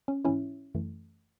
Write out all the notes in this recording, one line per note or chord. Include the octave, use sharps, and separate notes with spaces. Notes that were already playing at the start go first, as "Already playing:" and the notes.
C#4
G#2 E3 G#3 C#4 E4
F#2 E3 A3